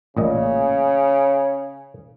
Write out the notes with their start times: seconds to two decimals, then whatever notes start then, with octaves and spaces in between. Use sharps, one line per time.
0.17 A1 A#2 C#3 D#5